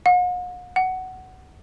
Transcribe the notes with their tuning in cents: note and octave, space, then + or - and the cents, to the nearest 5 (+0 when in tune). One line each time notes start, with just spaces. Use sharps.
F#5 -45
F#5 +10